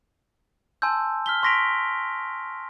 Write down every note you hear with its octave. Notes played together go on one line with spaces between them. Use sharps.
G#5 A5 C6 E6 G6
F6 B6 G7
C6 C#6 A#6 B6 D7 F7